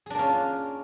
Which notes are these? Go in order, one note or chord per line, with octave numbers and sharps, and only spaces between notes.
A#3 C#4 D4 F4 G#4